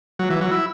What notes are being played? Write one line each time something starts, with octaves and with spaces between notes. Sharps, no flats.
F#3
E3
F#3
E4